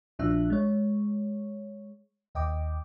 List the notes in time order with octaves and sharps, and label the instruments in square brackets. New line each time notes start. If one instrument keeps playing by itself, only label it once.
[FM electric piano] A#1 F3 D4 E5 F#6
G#3 C#5
D#2 D#5 G5 D6